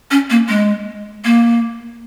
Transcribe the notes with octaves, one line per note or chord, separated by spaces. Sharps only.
C#4
A#3
G#3
A#3